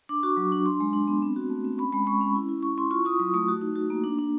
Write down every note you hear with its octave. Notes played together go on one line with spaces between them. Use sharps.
D4 D6
F#4 C#6
F#3
D4
D4 C6
G#3
D4
B3
C4
F#4
A3
C4
C#4 B5
G#3 B5
G#3 C#6
C#4
E4
E4
E4 C#6
E4 C6
F4 C#6
F4 D#6
F#3 D#6
A3 D#6
F#4
D#4
F#4
A#3
D4
D4